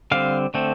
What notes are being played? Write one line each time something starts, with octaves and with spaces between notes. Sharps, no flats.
D3 G3 C4 F5
D3 A3 C4